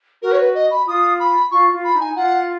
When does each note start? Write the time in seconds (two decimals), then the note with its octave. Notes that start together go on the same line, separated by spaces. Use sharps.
0.22 F#4 A#4
0.32 C#5
0.38 B4
0.55 D#5
0.70 B5
0.87 F4 D#6
1.19 B5
1.51 F4 C#6
1.73 F4
1.84 B5
1.94 D#4
2.00 G#5
2.16 F4 F#5